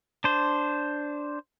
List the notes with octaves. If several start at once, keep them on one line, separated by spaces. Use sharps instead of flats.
D4 C5